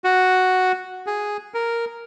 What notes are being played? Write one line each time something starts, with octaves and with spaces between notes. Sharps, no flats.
F#4
G#4
A#4